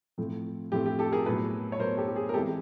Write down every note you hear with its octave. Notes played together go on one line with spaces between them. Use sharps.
A2 F3 A3 C4
A2 F3 A3 C4 G4
G4
G4 A4
G#4 A#4
A2 F#3 B3 A4 B4
C#5
A2 F#3 B3 A#4 C5
G4 A4
G4
G#4
A#4
C3 E3 G#3 C4 G4 A4